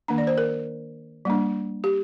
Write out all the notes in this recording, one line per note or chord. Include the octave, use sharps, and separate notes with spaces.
D#3 A#3 D4 A#5
D5
C5
A#4
G3 A#3 D4
G4